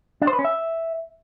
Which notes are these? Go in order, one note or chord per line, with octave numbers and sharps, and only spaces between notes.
D4
C5
B4
C#4
E5